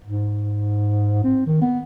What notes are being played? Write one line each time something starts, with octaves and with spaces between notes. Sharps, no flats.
G#2
C4
D#3
B3